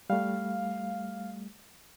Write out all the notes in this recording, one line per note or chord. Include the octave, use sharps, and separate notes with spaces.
G3 A3 F5